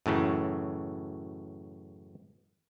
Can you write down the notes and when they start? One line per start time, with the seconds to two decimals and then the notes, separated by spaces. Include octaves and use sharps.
0.06 F#2 A2 C#3 E3